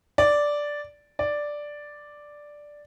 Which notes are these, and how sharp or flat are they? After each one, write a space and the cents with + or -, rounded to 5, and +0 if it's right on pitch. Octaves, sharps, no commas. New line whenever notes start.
D5 -5
D5 +0